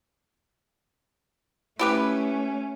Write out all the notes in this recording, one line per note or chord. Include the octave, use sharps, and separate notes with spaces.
A3 C#4 E4 G4 B4